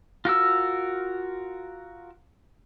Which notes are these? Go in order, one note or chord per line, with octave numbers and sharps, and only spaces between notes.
F4 F#4 A#4 E6